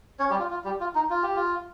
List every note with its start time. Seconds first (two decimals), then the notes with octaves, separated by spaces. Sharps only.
0.19 C#4 C#5
0.30 G3 G4
0.39 F4
0.51 F4
0.65 G3 G4
0.80 F4
0.95 D#4
1.10 F4
1.23 G4
1.36 F4